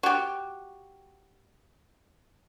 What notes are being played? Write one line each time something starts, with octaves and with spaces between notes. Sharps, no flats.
F#4 G4